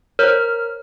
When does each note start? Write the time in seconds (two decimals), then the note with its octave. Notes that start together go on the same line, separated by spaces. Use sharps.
0.19 A#4 C5 C#5 F6